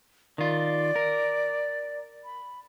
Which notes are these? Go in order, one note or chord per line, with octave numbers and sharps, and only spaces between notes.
D#3 F4 D5
A#4
B5